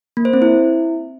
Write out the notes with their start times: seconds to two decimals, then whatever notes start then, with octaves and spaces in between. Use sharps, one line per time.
0.17 A#3
0.25 C5
0.33 C4
0.42 E4